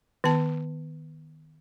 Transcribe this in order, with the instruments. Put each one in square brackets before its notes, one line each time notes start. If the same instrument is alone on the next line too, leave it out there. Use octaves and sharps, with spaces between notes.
[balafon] D#3 B3 A5